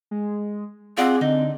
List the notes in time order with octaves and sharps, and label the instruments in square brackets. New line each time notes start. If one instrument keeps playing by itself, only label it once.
[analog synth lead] G#3
[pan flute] C4 [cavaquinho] F4 D5 F#5 [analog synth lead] G#4
[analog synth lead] D3 [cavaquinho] D#4